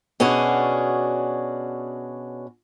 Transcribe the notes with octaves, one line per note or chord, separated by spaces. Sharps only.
B2 C#4 D4 F#4 G#4